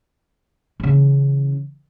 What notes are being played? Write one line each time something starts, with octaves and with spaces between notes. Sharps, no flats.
C#3 E3